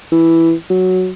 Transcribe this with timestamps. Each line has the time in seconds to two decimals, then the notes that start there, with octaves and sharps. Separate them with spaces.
0.12 E3
0.70 F#3